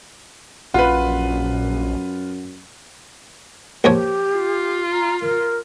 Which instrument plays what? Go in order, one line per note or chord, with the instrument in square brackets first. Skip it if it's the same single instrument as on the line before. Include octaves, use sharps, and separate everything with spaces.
[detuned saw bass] A#1 [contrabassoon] F#2 [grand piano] F4 B4 [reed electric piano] F#5
[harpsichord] A#1 F3 C#5 [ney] G4
[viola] F4
[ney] A#5
A#4